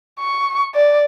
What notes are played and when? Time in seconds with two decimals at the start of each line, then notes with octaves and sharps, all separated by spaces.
0.20 C#6
0.75 D5